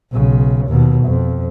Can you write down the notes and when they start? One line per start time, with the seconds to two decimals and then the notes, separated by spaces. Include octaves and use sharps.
0.12 B1 C#3
0.68 D#2 B2
1.05 F2